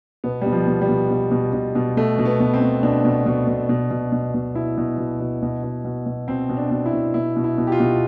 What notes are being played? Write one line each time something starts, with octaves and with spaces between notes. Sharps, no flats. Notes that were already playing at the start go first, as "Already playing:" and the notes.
B2 B3
B2 G3
F3
B2
G3
B2
B2
B2
B2
B2
B2 A3
B2
B3
B2
C4
B2
B2 D4
B2
B2
B2
B2
B2
B2
B2
B2 E4
B2
B2
B2
B2
B2
B2
B2
B2 C4
B2
D4
B2
E4
B2
B2 E4
B2
E4
B2
G4
F4
B2